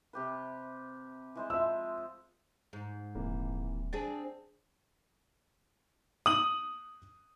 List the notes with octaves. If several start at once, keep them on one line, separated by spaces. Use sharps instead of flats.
C3 G4 B4
E3 G#3 C5
F3 E5 E6
G#2
D#1 C3 E3 A#3
C4 D4 G#4 A6
D#6 F#7